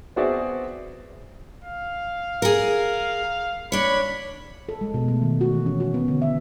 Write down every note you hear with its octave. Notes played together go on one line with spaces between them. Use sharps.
B3 C4 F#4 G#4 D5 E5
F5
G#4 A#4
D4 C#5 B5
A4
G#3
B2
A3
D#3
F#4
E3
C#4
F#4
B3
D3
E5